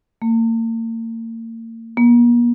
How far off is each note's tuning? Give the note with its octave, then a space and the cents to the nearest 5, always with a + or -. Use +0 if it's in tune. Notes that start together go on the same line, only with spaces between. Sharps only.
A#3 -40
A#3 +45